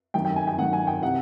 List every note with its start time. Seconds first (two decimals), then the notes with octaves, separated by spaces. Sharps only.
0.14 F#2 D#3 G5
0.25 G5
0.36 G#5
0.47 G5
0.58 F#2 D#3 F#5
0.73 G#5
0.87 G5
1.02 C3 E3 F#5